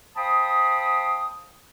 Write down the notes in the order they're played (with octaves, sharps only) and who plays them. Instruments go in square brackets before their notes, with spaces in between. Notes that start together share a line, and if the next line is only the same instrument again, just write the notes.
[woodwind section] C5 F5 G5 A5 B5 D#6